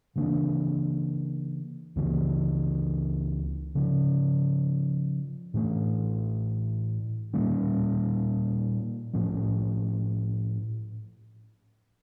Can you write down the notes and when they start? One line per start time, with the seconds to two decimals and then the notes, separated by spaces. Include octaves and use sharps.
0.16 C#3 E3 A#3 D4
1.96 C#2 C#3 E3 A#3
3.75 C#3 F3 C#4
5.54 A2 E3 A3 D4
7.34 A#2 G3 A#3 C#4
9.13 A2 F3 C#4